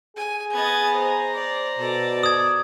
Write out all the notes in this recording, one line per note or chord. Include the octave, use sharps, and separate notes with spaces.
G#4 G#5
B3 D#5 G#6 A6
C5 A#5
D5
B2 A4 D5
D#6 G#6